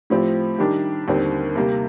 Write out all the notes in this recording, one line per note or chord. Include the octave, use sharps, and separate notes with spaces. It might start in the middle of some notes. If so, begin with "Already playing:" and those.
A2 F3 C4 G4
D#3 G3 D4 G4
D#2 D3 G3 C4
C3 G3 A#3